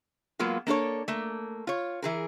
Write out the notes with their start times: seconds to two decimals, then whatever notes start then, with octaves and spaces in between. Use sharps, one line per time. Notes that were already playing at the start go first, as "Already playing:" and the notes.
0.39 F#3 G#3 A#3 B3 F4
0.67 A#3 D4 A4 C#5
1.08 A3 A#3
1.67 F4 C#5
2.02 E3 G#4 A#4